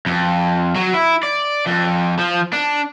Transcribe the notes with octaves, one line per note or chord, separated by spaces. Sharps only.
F2
F#3
E4
D5
F2
F3
D4